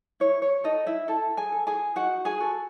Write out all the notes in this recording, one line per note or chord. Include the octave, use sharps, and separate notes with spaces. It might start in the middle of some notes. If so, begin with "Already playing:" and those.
E4 C#5
C#5
D#4 A4 D#5
E4 E5
E4 A4 A5
G#4 G#5
A4
G#4 G#5
D#4 F#4 F#5
G#4 G#5
F#4 A4